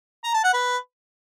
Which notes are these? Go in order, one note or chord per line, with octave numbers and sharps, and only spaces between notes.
A#5
A5
F#5
B4